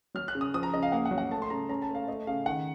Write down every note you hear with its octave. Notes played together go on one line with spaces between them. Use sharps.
F#3 F6
F#6
C#3
D#6
F3 D#6
A#5
C#3 D#5
F5
A#3 F#5
F#5
F#3
F#5
A3 A5
C6
C#3 A#5
C#4 A#5
A5
A3
F5
A3 D#5
C#3 F5
D#3 F#5